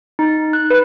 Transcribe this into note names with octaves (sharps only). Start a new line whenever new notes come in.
D#4
F#6
B4